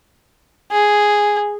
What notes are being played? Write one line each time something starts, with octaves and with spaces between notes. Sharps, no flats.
G#4